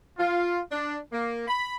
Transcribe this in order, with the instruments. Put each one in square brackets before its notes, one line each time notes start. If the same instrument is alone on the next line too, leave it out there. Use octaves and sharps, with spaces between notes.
[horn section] F4
D4
A#3
B5